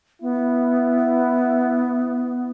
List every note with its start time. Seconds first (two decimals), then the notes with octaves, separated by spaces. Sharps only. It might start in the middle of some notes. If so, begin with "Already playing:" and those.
0.22 B3 E4